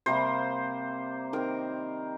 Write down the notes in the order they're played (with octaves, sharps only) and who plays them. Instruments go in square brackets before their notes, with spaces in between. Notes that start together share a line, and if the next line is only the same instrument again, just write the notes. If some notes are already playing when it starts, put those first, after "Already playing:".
[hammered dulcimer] C3 G3 A#3 C5
D#3 C4 A#4